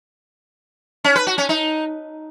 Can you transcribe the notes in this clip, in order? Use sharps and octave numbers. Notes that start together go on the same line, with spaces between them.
C#4
B4
F#4
C#4
D#4